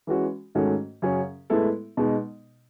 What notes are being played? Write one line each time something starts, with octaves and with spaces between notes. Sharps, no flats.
E3 G#3 C#4 F#4
G#2 D#3 A3 C#4 F#4
F#2 C#3 F#3 C#4 G#4
A2 G#3 B3 E4 A4
B2 G#3 D#4